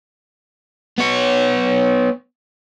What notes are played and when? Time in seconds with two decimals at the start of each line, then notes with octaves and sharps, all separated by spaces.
0.98 B3 C#5